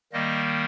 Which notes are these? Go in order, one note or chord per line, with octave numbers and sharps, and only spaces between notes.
D#3 G3 A#3 D#5